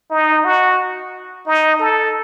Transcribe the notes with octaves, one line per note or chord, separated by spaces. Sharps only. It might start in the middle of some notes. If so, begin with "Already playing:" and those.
D#4
F#4
D#4
A4